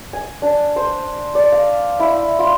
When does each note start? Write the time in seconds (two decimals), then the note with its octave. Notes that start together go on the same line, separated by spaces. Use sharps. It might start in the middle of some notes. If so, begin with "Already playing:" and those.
0.13 G#5
0.42 D4
0.76 C5
1.35 D5
1.52 F5
2.00 E4
2.39 F4